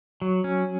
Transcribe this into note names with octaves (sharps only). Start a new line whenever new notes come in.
F#3
C#4